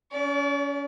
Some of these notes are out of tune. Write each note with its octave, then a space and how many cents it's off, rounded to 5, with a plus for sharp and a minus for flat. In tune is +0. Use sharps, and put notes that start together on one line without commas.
C#4 +30 D5 -30